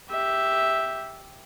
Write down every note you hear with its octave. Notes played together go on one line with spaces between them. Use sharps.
G4 E5